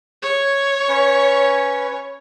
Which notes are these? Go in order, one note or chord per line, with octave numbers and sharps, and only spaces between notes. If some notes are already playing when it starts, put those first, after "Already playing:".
C#5
C#4 B4